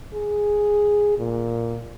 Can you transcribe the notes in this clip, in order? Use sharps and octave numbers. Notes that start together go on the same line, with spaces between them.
G#4
A#2